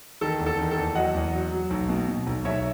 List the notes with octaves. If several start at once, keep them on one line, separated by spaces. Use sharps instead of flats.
D#3 A4
E2
A4
D#3
A4
E2
F#3 D#5 F#5
E2
F#3
F#3
B1
B2
B2
B1
B1 C#5 E5